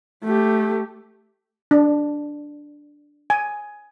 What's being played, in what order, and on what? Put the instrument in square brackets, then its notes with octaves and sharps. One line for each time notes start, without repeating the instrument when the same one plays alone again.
[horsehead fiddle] A3 G4
[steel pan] D4
G#5